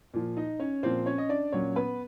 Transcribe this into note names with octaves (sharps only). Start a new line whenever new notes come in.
A#2 F3
D#4 D#5
C#4 C#5
A#2 F3 C4 C5
C#4 C#5
D#5
D4 D5
A#2 F#3 C#4 C#5
B3 B4